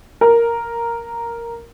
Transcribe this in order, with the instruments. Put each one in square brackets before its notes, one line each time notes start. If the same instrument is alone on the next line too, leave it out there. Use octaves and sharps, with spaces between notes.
[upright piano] A#4